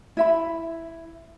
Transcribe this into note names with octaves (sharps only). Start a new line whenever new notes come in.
E4 E5 B5